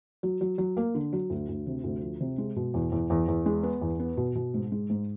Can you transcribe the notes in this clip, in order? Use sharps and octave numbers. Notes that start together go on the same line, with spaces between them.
F#3
F#3
F#3
A#3
D3
F#3
D2
D2
C3
D2
F3
C3
G#3
B2
E2
E2
E2
E2
G#3
B3
E2
B3
B2
B2
G#2
G#3
G#2